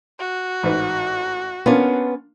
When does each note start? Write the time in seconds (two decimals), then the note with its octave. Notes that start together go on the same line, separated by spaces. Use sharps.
0.19 F#4
0.63 A1 G#2 B4
1.66 A#3 B3 C#4 D4 F4